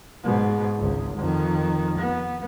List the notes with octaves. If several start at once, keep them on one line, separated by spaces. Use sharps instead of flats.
G#2 B2
G#1 C#2
F2 D#3
B3